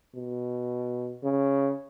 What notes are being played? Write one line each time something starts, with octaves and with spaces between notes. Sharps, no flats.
B2
C#3